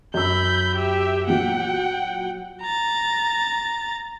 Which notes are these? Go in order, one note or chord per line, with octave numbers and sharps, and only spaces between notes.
F#2 B5 E6 G6
G4 E5
A#2 F#3 F#5 G5
A#5 A6